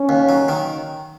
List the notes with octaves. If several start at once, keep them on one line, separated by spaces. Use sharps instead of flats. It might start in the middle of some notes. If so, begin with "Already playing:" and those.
Already playing: C#4
D#2
F#3
D#3